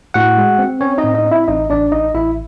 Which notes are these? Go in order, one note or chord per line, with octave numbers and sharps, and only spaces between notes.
A2 F#4 F#5
G#3
C4
C4 C#4 C#5
D#4 D#5
A2
D#4 D#5
C4
E4 E5
A1 D#4 D#5
A1 D4 D5
A1 D#4 D#5
A1 E4 E5